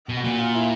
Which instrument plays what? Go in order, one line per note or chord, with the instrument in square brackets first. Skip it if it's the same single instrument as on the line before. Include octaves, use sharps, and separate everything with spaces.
[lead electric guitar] B2
[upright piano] F#4
[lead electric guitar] A#2
[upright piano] F4
E4